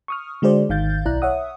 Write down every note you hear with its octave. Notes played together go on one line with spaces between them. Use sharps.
C#6 D#6 F6
D3 G#3 F#4 G#4 C5 D5
G#1 D#3 F5 G6 A6
B1 E4 D5 A#5 F#6
C#5 E5 F#5 D#6